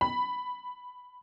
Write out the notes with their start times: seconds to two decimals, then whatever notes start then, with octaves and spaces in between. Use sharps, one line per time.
0.01 B5